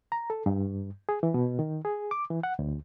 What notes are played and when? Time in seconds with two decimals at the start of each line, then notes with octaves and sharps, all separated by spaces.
0.12 A#5
0.30 A4
0.46 G2
1.09 G#4
1.23 E3
1.34 B2
1.59 D#3
1.85 G#4
2.11 D6
2.30 E3
2.43 F#5
2.59 D2